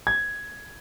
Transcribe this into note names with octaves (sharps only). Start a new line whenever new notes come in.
G#6